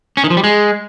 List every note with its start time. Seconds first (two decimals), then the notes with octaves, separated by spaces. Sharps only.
0.17 C#4
0.24 D#3
0.30 F3
0.37 G3
0.44 G#3